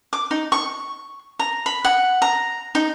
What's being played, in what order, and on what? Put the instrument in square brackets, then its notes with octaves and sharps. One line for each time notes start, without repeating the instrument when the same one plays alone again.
[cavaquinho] D6
D#4
C#6
A#5
B5
F#5
A#5
D#4